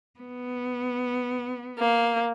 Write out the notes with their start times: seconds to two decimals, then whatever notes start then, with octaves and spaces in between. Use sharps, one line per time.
0.19 B3
1.78 A#3